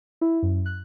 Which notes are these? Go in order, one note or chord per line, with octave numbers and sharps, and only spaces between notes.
E4
F#2
F#6